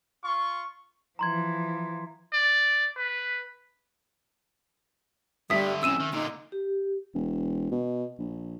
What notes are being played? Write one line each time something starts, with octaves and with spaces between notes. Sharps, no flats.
F4 C#6
E3 F3 A#5 C6 G#6
D5
B4
G2 D3 G3 E5 D#6 B6
F2 A2 C#4 E6 D#7 E7
D#3
A#2 D3 D#4
G4
E1
B2
A#1